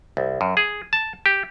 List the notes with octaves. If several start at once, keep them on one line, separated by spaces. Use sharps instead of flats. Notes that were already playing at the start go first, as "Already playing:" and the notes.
C2
F#2
G#4
A5
G4